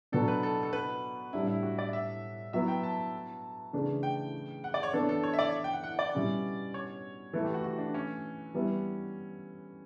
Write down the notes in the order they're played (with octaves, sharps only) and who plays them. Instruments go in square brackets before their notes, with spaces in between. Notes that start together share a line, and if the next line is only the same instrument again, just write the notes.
[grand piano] B2 F#3 B3 D4 [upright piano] A4
[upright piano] B4
A4
A4
B4
[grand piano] A2 G3 D4 [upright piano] E4
[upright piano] E4
F#4
D5
E5
[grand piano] F#3 B3 E4 [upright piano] E5
[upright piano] G5
A5
[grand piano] C#3 E3 A3 D4
[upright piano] G5
F#5
D5
C#5
[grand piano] E3 B3 D4 [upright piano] A4
[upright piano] A4
C#5
E5
D5
G5
F#5
F#5
D5
[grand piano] B2 G3 C#4 E4
[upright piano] C#5
[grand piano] E3 A3 E4 [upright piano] A4
[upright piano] G4
F#4
F#4
D4
C#4
[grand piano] E3 G3 B3 E4